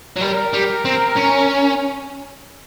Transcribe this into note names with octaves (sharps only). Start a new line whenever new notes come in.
F#3
G3 A#4
G3
C4
C#4